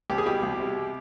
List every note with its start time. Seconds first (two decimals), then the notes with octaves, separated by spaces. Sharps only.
0.10 C2 G4
0.18 G#4
0.26 B2 G4
0.43 C2
0.60 C3